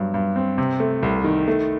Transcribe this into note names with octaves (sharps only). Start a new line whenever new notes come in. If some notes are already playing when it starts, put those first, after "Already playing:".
Already playing: G2 F#3
G2
C4
C3
A3
C2
D#3
A3